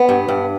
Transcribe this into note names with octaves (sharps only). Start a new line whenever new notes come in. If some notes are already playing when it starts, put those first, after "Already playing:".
Already playing: B3
G2
G2